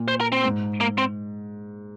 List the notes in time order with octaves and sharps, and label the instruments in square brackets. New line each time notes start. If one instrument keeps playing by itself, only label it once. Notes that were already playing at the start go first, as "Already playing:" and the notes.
Already playing: [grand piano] A#2
[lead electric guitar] C5
A#4
C4
[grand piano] G#2
[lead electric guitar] A#3
C4